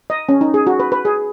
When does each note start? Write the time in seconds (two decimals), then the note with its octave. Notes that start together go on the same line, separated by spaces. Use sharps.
0.10 D#5
0.29 C#4
0.41 D#4
0.54 G#4
0.67 F#4
0.80 B4
0.92 B4
1.05 G#4